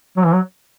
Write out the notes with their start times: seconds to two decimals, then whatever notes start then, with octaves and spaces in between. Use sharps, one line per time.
0.17 F#3
0.25 E3
0.33 F#3